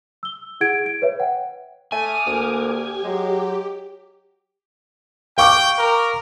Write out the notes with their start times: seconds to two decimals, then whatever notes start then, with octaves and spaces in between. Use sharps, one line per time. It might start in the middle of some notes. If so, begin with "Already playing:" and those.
0.23 E6 G7
0.61 E4 G#4 F#5 G#6 D7
0.85 G#6 D7
1.02 B4 C#5 E5
1.20 F#5 G5
1.92 A3 G#5 D6 D#6 F6
2.27 D2 A#3
2.60 G4
3.04 F#3 G#3
5.38 F5 G5 C#6 D6
5.78 A#4